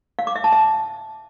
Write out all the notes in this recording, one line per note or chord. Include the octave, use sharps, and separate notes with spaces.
F5
D6
E5
A5
E5